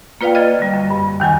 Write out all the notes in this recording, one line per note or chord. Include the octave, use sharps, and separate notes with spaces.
A#3 F4 B4 D5 F5 G5
D5 D#5 F6 G#6 A6
D3 G3
F#2
G2
D#2 D#3 F#3 G#5